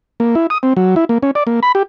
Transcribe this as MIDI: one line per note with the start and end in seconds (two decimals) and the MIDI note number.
0.20 0.35 58
0.35 0.47 64
0.50 0.58 87
0.63 0.73 60
0.77 0.95 54
0.96 1.05 64
1.09 1.18 58
1.23 1.31 61
1.35 1.44 74
1.47 1.60 58
1.63 1.72 83
1.75 1.83 67